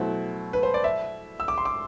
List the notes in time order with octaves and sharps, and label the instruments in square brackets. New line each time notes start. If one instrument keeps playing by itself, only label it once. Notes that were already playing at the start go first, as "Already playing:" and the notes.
Already playing: [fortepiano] B2 F#3 A3 E4 [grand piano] C5
[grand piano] B4
C5
D5
E5
E6
D6
C6
D6